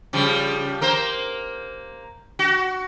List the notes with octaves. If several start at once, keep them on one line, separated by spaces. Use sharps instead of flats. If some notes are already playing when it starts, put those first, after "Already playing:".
C#3 F3 G3
A#3 A#4 C5
F#4